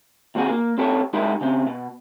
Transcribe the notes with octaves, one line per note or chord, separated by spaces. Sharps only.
D#2 B2 C4 F#4 G#4
A#3
C4 G4 A4 B4 C#5
G#3 D#4 E4 G4 A#4
C#3 C4
B2